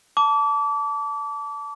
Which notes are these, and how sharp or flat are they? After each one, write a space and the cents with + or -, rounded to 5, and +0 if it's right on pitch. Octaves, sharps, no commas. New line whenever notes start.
A5 +0 D6 -30